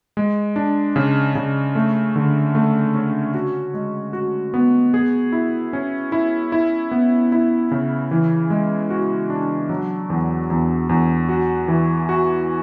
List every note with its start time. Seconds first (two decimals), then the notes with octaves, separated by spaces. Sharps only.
0.17 G#3
0.56 D4
0.96 C#3
1.35 C#3
1.75 A3
2.16 D3
2.55 A3
2.95 C#4
3.34 F#4
3.74 G#3
4.13 F#4
4.54 B3
4.94 G#4
5.32 E4
5.73 C#4
6.12 E4
6.52 E4
6.91 B3
7.32 E4
7.71 C#3
8.11 E3
8.50 G#3
8.90 F#4
9.30 D4
9.69 F#3
10.10 E2
10.50 E2
10.89 E2
11.29 F#4
11.68 E3
12.09 F#4